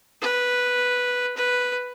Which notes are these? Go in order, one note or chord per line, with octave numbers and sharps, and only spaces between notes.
B4
B4